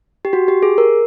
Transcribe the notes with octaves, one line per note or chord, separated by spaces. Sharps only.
G4
F#4
G4
G#4
A#4